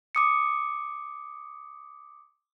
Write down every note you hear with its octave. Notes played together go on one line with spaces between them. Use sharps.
D6 D#6 C#7